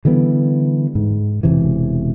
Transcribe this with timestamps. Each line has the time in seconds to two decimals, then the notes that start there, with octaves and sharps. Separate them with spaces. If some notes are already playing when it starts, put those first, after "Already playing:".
0.05 D3 E3 G3 B3
0.95 G#2
1.43 E1 C3 E3